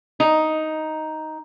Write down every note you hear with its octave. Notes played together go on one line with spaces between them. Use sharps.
D#4